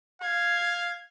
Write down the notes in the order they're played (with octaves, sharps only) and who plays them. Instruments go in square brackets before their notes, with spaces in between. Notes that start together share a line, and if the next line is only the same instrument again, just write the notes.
[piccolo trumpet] F5 [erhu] G#6